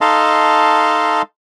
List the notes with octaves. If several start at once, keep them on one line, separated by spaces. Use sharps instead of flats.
D#4 A4 D#5 F5 A5 C6